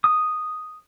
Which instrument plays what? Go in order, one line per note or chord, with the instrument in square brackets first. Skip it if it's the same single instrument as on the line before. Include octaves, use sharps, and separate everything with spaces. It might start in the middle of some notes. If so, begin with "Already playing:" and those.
[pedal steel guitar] D#6